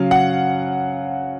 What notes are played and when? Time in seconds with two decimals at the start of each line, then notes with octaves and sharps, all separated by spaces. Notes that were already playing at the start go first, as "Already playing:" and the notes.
Already playing: C#3 F#3 F5
0.11 F#5